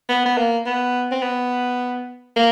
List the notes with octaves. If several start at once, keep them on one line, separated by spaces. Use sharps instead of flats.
B3
B3
A#3
B3
C4
B3
A#3